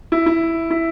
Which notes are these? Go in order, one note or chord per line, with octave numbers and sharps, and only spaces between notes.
E4
E4
E4